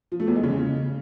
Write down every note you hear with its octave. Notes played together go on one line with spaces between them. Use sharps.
F3
A3
E2
G#3
C#3